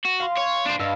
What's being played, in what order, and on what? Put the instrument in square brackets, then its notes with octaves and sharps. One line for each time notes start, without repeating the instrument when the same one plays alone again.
[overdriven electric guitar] F#4 [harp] A#6
[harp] F5 C6
[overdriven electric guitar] C#5
D4 C5
[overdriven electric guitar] G2 [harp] D#5 F5 E6